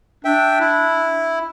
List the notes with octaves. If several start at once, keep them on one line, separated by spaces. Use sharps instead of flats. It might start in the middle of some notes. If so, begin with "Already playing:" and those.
D4 E5 G5
E4